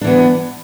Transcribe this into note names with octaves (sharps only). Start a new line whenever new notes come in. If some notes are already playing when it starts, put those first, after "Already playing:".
E3 B3 D4